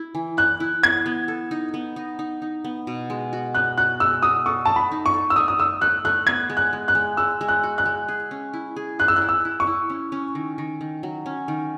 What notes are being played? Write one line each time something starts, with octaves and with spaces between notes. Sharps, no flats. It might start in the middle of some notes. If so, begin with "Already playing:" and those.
Already playing: E4
E3
E4 F#6
E4
B3 G#6
B3
A4
D#4
B3
D#4
D#4
D#4
B3
B2
G#3
F#4
B3 F#6
F#4 F#6
G#3 E6
F#4 D#6
A4 C#6
A3 A5
B5
D#4
C#6
A4
E6
A3 D#6
D#6
A3 E6
A3 F#6
A3 F#6
B3 G#6
G#3
F#6
G#3
F#6
G#3
G#3 E6
G#3
F#6
F#4
F#6
G#3
G#4
C#4
E4
G#4
G#4 F#6
E6
F#6
E4
E6
E4
C#6
E4
C#4
C#4
D#3
D#3
D#3
F#3
C#4
D#3